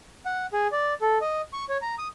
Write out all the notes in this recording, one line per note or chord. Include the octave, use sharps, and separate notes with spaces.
F#5
G#4
D5
A4
D#5
C#6
C#5
A#5
D#6